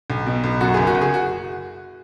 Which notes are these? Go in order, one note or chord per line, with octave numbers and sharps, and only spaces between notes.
B1
B2
B1
F#2 F#4
F#1 G#4
F#4
F#1
G#4
F#4